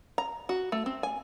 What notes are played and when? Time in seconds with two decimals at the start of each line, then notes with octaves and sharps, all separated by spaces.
0.18 A#5
0.49 F#4
0.72 A3
0.86 C4
1.03 G#5